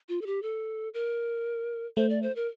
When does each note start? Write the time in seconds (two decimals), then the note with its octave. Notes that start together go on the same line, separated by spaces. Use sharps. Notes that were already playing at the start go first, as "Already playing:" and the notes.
0.09 F4
0.21 A4
0.26 G4
0.43 A4
0.94 A#4
1.97 A3 C5
2.10 D5
2.22 C5
2.36 A#4